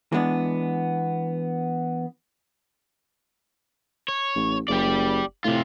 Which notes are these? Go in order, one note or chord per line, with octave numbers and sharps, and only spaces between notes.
E3 G#3 B3 D4
C#5
A1
F#1 G4 D5
A2 C3 F4